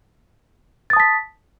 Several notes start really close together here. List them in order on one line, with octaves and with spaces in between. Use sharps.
A6 D#6 A5 B6